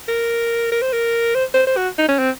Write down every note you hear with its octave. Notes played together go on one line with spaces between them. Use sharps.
A#4
A#4
C5
A#4
C5
C5
C5
F#4
D#4
C#4
C4